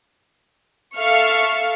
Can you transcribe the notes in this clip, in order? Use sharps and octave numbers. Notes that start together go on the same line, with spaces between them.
A4 E5 F5 C#6 F6